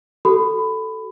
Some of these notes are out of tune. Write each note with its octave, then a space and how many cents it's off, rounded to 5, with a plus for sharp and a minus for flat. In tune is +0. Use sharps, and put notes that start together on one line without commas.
F#4 +40 A4 +0 B5 +15